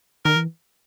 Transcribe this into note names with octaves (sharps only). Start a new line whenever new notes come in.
D#3 A#4
E3